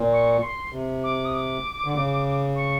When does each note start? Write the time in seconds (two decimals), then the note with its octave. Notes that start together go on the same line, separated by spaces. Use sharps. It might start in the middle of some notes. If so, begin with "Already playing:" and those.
Already playing: A#2
0.13 C#6
0.42 C6
0.72 C3
1.04 D6
1.25 D#6
1.34 D6
1.84 D3
1.95 C#3
2.56 C#6